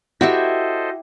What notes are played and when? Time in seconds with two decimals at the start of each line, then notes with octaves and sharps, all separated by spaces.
0.21 E4 F#4 G4 A4 C5 D#5 E5